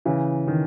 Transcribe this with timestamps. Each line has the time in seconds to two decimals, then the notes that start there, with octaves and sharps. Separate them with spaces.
0.05 C#3 E3
0.48 D#3